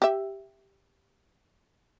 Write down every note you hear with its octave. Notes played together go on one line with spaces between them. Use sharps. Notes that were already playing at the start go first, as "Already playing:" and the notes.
G4 E5